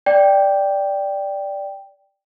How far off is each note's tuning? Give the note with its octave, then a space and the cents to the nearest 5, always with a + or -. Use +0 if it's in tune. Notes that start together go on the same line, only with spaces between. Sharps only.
D5 +0 G5 +0